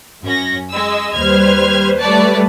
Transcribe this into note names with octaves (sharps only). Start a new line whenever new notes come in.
F#2 C#4 A#6
G#3 D#5 E6
D#2 G3 B4 C5 F6 G#6
G3 A3 B4 C#5 D5 A5